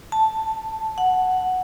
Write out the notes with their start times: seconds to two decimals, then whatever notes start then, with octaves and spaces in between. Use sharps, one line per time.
0.12 A5
0.98 F#5